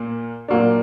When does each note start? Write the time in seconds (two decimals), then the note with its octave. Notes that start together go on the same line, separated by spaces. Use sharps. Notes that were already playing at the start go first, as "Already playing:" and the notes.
Already playing: A#2 A#3
0.48 A#2 F#3 A#3 D4